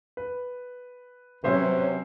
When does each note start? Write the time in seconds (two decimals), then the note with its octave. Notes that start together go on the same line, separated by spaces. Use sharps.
0.17 B4
1.44 C3 F#3 C#4 B4 C5 E5